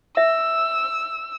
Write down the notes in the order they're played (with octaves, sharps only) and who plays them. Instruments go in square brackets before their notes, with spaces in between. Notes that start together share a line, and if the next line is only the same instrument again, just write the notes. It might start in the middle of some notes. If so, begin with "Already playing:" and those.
[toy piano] E5 [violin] E6